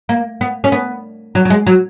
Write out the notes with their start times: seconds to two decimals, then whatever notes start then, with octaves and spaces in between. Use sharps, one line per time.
0.09 A#3
0.41 B3
0.64 C#4
0.72 B3
1.35 F#3
1.45 F#3
1.50 G#3
1.67 F#3